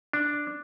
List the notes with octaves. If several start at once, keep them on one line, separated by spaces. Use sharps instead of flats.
D4